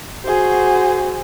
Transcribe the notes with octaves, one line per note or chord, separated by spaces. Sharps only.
F#4 G#4 C5